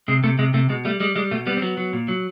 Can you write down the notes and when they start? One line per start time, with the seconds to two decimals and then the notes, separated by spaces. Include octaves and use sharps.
0.08 C3 G#3
0.23 C3 A3
0.39 C3 G#3
0.54 C3 A3
0.69 B2 G#3
0.85 G3 A3
1.00 G3 G#3
1.15 G3 G#3
1.31 B2 A3
1.47 G3 B3
1.57 C4
1.62 F#3 B3
1.77 F#3
1.93 A#2
2.08 F#3